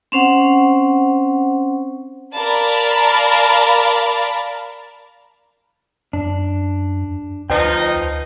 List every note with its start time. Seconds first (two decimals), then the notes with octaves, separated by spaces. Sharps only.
0.12 C4 C#4 C5 F#5
2.35 A#4 D5 F5 A5 B5
6.13 F#2 D4
7.50 D2 F3 D#4 B4 C5 D#5 G5